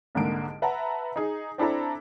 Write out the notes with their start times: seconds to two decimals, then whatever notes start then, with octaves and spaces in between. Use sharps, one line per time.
0.15 C2 G#2 D3 G#3 A#3 D7
0.62 B4 E5 F#5 A5 A#5
1.16 D#4 G#4
1.58 C4 D4 E4 A4 A#5